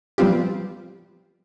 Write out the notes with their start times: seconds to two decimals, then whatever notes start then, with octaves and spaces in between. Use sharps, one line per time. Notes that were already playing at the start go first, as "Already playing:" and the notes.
0.18 F3 G3 B3 C4 F4 G4